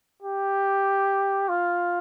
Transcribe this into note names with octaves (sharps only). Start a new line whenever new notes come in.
G4
F4